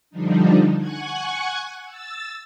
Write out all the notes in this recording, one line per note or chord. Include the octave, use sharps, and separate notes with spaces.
D3 F3 G3 D4 D#4
F#5 G#5 C#6 F#6 G#6
E6 A6